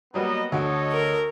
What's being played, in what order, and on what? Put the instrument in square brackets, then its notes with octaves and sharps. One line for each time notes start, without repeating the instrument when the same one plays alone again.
[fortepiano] F#3 G3 A#3 [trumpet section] B3 D#5
[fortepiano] D2 F#4 [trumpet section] A4 C#5 D#5
[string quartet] A#4